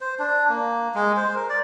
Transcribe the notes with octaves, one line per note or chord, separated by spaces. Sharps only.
C5
D4
A#3
G#3
C5
A#4
D5